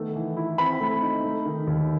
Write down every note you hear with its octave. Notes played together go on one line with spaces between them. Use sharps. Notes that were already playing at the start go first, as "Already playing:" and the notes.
Already playing: D#3 A3 B3
E3
E4
C4 B5
A3
D#4
A3
D#3
D#2